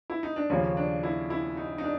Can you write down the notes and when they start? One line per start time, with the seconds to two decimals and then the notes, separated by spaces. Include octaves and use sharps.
0.10 E4
0.23 D#4
0.36 D4
0.50 D#2 C#3 F3 A#3 C#4
0.77 D4
1.03 E4
1.30 E4
1.57 D#4
1.78 D#4
1.84 D4